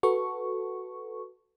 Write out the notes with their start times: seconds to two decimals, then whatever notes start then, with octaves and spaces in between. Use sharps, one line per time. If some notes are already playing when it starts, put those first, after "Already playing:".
0.03 F#4 A4 B4 C#6